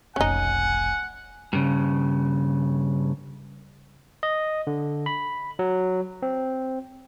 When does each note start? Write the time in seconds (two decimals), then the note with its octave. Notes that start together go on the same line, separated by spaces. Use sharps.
0.16 F1 B1 C#4 D#4 F#5 G#5
1.53 G2 C#3
4.23 D#5
4.67 D3
5.06 B5
5.59 F#3
6.22 C4